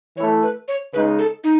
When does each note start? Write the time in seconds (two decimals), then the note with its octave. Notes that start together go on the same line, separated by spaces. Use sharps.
0.17 E3 A3 E4 C#5
0.43 B4
0.68 C#5
0.93 C#3 G#3 D#4 B4
1.19 A4
1.44 D#4